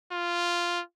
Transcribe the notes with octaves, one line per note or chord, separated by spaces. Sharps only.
F4